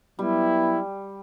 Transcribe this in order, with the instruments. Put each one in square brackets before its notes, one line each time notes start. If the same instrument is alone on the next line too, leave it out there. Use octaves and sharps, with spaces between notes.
[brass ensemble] F#3 B3 E4 [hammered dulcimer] G3